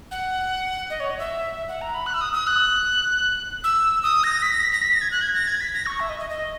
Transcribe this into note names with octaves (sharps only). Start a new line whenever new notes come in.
F#5
D#5
C#5
D#5
E5
F#5
A#5
B5
F#6
E6
D#6
D#6
F#6
E6
D#6
A#6
B6
A#6
B6
A#6
B6
A#6
G#6
F#6
G#6
A#6
G#6
B6
A#6
C#6
E5
D#5
D#5
D#5